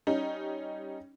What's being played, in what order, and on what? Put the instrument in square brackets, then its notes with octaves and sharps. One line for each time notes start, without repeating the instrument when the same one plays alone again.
[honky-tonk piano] G3 C#4 D#4